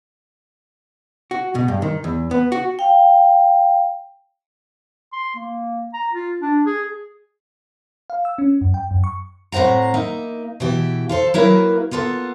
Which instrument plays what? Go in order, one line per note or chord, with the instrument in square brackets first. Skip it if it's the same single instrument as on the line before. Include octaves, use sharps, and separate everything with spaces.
[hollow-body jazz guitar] F#4
B2
G2
D#3
E2
B3
F#4
[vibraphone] F5 G5
[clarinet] C6
A#3
A#5
F4
D4
G#4
[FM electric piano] F5
E6
C#4
F#2
G5
F#2
C#6
[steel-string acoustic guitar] A2 C4 C5 F#5 A#5
A#3 D#4 E5
B2 E3 E4 G4
F4 A4 C5
F#3 A#3 E4 A#4 B4 E5
A#3 B3 F4 A4